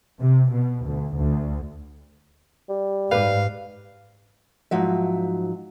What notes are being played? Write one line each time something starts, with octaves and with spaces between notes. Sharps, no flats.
C3
B2
D2
D2
G3
G#2 G4 B4 F5
G#2 F3 F#3 E5